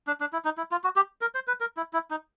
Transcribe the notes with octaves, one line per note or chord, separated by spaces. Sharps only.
D4
D4
E4
D#4
E4
F4
F#4
G4
A#4
C5
B4
A#4
E4
E4
D#4